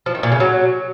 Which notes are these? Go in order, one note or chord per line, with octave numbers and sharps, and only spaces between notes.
F3
D#3
A#2
C#3
F#3